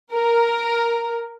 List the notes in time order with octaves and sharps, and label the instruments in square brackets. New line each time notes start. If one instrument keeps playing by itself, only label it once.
[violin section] A#4